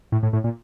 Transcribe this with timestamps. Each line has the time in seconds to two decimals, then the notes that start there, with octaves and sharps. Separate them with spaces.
0.12 A2
0.23 A2
0.33 A2
0.44 A#2